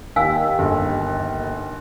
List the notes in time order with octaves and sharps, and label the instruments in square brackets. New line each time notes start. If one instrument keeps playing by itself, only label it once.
[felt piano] D#2 [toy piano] F5 G#5 E6
[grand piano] G1